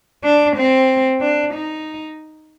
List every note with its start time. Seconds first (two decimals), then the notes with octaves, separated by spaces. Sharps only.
0.24 D4
0.56 C4
1.21 D4
1.53 D#4